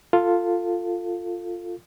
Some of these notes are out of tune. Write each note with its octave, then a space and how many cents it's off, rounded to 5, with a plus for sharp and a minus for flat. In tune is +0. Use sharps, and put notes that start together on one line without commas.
F4 +0 A4 +20